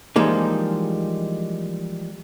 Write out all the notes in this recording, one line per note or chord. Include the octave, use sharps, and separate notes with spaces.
E3 F3 G3 G#3 A#3 D#4